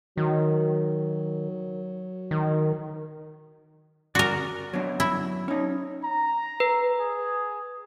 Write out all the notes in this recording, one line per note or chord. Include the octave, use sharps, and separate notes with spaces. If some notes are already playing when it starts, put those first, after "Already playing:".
D#3 F#3
D#3
F#4 A#4 D5
F#3 B3 D4
E4
C#4 D#4
A#5
B4
G#4